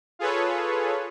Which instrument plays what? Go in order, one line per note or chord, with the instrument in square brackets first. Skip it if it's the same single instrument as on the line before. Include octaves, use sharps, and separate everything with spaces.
[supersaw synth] F4 G#4 A4 B4 C#5